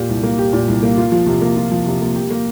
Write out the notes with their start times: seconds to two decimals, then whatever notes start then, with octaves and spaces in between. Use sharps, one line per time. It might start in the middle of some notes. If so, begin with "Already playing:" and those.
Already playing: A#2 G4
0.09 C2
0.23 A#3
0.39 G4
0.53 A#2
0.68 C2
0.83 A#3
0.98 F4
1.12 F3
1.26 C3
1.42 A#3
1.57 F4
1.72 F3
1.86 C3
2.01 A#3
2.16 G4
2.31 A#3